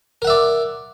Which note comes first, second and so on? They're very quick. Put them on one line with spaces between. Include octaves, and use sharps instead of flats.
A#4 F#5 E5 D5